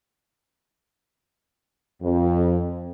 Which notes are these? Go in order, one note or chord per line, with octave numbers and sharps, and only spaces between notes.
F2